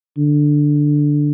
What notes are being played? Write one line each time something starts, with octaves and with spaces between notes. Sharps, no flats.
D3